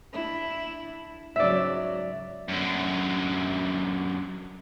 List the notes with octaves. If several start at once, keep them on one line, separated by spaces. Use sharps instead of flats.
D4 E4
G#2 C#3 F#3 D5 E5
F#2 D3